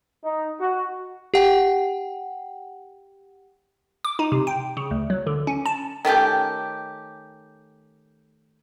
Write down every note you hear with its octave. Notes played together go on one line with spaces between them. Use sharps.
D#4
F#4
G4 F#5 G5
D6
D#4
C3
G5
C#3
D2
F#3
D3
C#4
A5
D#3 A3 C#4 G4